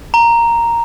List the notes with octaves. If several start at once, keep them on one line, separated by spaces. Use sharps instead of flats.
A#5